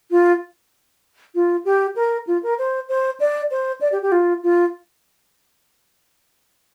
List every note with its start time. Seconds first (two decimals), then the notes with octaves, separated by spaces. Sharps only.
0.11 F4
1.35 F4
1.65 G4
1.96 A#4
2.27 F4
2.43 A#4
2.58 C5
2.89 C5
3.20 D5
3.51 C5
3.81 D5
3.92 G4
4.02 G4
4.12 F4
4.43 F4